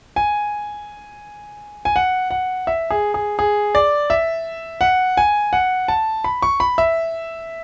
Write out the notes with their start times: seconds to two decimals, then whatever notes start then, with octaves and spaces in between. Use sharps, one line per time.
0.16 G#5
1.85 G#5
1.96 F#5
2.31 F#5
2.67 E5
2.90 G#4
3.14 G#4
3.39 G#4
3.75 D5
4.10 E5
4.81 F#5
5.17 G#5
5.53 F#5
5.88 A5
6.24 B5
6.42 C#6
6.60 B5
6.78 E5